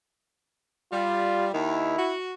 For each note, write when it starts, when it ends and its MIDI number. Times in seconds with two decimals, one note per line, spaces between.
0.93 1.50 55
0.93 1.49 65
1.54 1.98 39
1.54 1.98 51
1.54 2.15 64
1.98 2.33 66